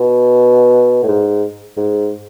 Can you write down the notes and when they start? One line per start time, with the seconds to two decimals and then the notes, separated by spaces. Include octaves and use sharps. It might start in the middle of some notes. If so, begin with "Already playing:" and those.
Already playing: B2
1.03 A2
1.08 G#2
1.77 G#2